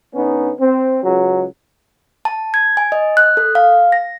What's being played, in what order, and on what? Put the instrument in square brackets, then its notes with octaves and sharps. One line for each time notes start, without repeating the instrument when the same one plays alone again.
[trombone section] D3 B3 C#4 D#4
C4
C#2 F#3
[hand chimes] A5
G#6
G#5
D#5
F#6
A4
F5
A#6